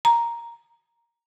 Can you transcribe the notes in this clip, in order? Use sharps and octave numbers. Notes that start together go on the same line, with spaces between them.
A#5